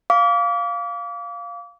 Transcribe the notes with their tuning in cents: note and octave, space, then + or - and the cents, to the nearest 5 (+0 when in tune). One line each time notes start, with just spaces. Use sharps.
F5 +0 D6 -35